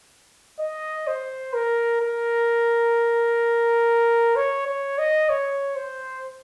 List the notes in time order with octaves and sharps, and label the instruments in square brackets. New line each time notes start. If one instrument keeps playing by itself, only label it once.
[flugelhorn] D#5
C5
A#4
A#4
C#5
C#5
D#5
C#5
C5